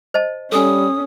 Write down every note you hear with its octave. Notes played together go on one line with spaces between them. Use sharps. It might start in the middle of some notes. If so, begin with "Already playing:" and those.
C5 D#5 A5
G3 C#4 A4 G#5 D#6